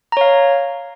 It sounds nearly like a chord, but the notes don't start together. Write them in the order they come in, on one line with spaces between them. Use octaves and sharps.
A#5 C#5 F5